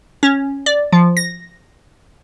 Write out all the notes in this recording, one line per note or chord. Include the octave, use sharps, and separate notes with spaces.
C#4
D5
F3
A#6